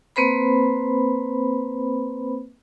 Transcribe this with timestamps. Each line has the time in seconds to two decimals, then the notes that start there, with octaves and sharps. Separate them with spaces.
0.16 A#3 C4 B4 C5 B5